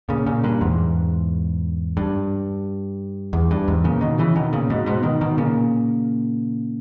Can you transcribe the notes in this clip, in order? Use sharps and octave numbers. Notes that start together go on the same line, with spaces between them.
A#2 C#3
A#2 C#3
G2 A#2
E2 G#2
G2
E2
G2
E2 G#2
A#2 C#3
B2 D#3
C#3 E3
B2 D#3
A#2 C#3
G#2 B2
G#2 B2
B2 D#3
B2 D#3
A#2 C#3